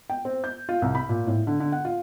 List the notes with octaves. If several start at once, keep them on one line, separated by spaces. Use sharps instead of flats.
G5
C4
G6
F4
C2
B5
A#2
A2
D3
D3
F#5
F4